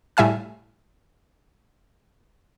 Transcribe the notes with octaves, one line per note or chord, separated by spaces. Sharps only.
A2 G3 E5 G#5 F6